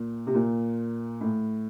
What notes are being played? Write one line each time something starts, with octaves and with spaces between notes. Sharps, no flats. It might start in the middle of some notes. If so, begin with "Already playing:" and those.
Already playing: A#2
C3
A#2
A2